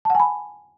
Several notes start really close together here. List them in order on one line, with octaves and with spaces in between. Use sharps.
A5 F#5 G#5 B5